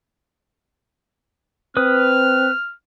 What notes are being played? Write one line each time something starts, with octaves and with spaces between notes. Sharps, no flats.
C4 B4 D#6 F6